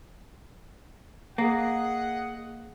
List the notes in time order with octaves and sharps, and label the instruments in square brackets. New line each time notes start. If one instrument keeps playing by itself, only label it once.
[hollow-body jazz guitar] A#3 [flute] G#4 [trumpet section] D#5 F#5